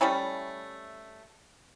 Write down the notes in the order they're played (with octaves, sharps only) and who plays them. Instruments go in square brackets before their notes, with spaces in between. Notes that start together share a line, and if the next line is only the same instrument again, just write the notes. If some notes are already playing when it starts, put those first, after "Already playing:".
[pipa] G3 A3 C#4 E4